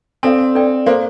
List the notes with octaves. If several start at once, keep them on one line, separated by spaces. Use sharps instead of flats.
C4 D4 A4 D5 F5
D4 A4 D5 G5
A#3 A4 C5 F5 C6